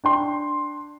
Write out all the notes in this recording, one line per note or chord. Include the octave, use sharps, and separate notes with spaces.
D4 G5 C6